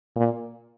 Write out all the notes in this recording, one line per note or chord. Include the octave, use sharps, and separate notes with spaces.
A#2